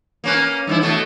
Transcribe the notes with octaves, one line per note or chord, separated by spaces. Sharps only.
A#3 C#4 B4
G2 E3 E4
B2 A3